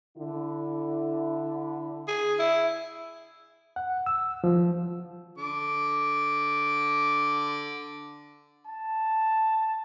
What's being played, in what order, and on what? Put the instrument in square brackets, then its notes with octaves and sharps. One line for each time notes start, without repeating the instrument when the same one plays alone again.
[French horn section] D3 E4
[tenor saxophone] G#4
E4
[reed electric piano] F#5
E6
F3
[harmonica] D3 D6
[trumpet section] A5